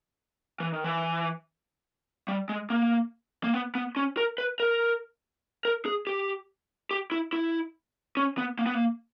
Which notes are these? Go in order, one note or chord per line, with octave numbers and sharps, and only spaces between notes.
E3
D#3
E3
G3
G#3
A#3
A#3
B3
B3
C#4
A#4
B4
A#4
A#4
G#4
G4
G4
E4
E4
C#4
B3
A#3
B3
A#3